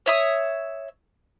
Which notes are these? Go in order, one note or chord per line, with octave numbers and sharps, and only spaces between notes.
C#5 E5 D#6